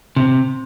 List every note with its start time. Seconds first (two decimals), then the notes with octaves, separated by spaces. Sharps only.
0.16 C3